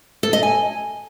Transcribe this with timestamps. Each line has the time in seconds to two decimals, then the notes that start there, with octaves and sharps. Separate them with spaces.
0.23 A4
0.33 D#5
0.43 G#5